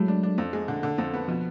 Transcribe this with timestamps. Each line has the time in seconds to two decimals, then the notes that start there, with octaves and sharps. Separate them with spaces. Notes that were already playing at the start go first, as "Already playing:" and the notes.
Already playing: A2 F#3 G#3 A3
0.08 D4
0.23 D4
0.38 F2
0.53 G#3
0.68 D3
0.83 D3
0.98 F2
1.14 B3
1.28 B2 F3